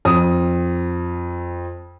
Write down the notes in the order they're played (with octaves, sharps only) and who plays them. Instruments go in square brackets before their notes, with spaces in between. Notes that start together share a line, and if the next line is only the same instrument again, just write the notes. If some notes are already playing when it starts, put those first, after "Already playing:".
[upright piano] F2 D#6